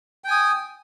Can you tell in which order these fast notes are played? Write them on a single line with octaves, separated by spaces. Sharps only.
G5 G#5 D#6